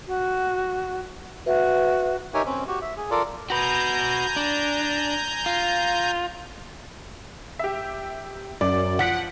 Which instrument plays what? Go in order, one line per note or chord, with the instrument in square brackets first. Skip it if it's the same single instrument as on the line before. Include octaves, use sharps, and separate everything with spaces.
[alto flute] F#4
[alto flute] F#4 [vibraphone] B4 E5
[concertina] D#4 G4 A#4 C#5 E5 G#5
C4 C#4
F#4 G4
E5
G#4
F4 A4 A#4 D5
[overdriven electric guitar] F#4 B4 [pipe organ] G#5 A#5 G6
[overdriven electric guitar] D4
F4
[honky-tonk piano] G4 E5
[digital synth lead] F#2 [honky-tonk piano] D5
[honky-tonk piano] F3 B6 D7 [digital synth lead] F#5